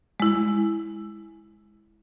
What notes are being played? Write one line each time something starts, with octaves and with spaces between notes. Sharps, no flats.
G#3 E4